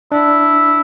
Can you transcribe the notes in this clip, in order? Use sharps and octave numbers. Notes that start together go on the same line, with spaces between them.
D4 E4